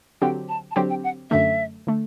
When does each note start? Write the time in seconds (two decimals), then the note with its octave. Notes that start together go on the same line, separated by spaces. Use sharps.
0.21 D3 F#3 C4 G4 G5
0.49 A5
0.71 A5
0.76 D3 F#3 C4 G4 G5
0.90 G5
1.04 F#5
1.31 F#2 D3 A3 E5
1.87 D3 A3